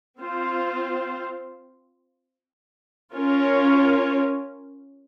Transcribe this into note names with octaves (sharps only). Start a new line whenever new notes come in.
C4 F4 C5
C#4 F4 A#4 C#5